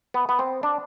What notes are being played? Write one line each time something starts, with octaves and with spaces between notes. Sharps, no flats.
B3
B3
C4
D4